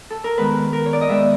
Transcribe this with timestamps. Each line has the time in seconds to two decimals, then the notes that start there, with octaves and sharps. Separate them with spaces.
0.10 A4
0.24 A#4
0.37 D#3 G#3 B3 B4
0.73 A#4
0.86 C#5
0.93 D5
1.01 D#5
1.09 D#3 G#3 B3 E5